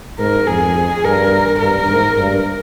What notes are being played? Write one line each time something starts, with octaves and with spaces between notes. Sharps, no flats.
G#2 A#4
F2 G#4
G2 A#4
G2 A#4
G#2
G2